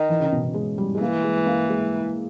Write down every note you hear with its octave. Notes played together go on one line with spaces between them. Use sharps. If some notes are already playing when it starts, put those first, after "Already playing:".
Already playing: D#3
E3
C#3
B2
B2
G#3
G3
G#3
E3 A#3
G#3
A#3
G#3